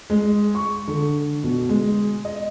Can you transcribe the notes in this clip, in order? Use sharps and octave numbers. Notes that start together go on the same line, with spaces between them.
G#3
C#6
D3
B2
G#3
D#5